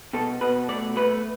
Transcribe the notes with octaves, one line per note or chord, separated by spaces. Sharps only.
B2 A4
B2 B4
A3 D5
A3 B4